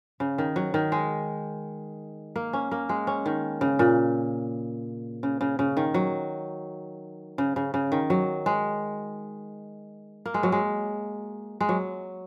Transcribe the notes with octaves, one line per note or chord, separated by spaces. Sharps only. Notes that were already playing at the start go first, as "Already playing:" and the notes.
C#3
D#3
F#3
D#3
G#3
A#3
C#4
A#3
G#3
C#4
D#3
C#3
A#2
C#3
C#3
C#3
D#3
F#3
C#3
C#3
C#3
D#3
F#3
G#3
A#3
G#3
F#3
G#3
G#3
F#3